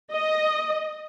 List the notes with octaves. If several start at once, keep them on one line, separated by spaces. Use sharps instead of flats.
D#5